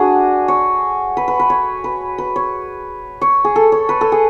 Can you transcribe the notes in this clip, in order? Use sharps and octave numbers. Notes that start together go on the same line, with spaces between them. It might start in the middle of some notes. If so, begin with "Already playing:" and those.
Already playing: D4 F#4 G#4
C#5
B4
B4
B4
C#5
B4
B4
C#5
C#5
G#4
A4
C#5
B4
A4
G#4